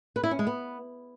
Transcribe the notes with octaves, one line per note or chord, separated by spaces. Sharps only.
B4
E4
C#4
G#3
B3